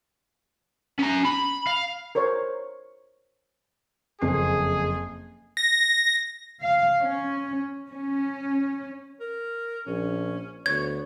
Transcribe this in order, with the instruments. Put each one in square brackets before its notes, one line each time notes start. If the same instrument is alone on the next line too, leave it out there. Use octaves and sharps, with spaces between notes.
[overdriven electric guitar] C#4 A#5
B5
F5
[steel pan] A#4 C5 C#5
[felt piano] F#1 F2 C7 [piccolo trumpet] G#4
[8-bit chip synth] A#6
[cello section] F5
C#4
C#4
[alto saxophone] A#4
[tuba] A#1 [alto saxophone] C#4
[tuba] D2 [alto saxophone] B3 [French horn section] C#5 [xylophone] G#6